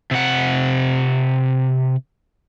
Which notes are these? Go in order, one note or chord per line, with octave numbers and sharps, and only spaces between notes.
C3 F#5